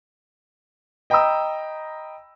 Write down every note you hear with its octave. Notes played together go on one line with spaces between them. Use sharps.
D#5 G5 A#5 B5 D#6 E6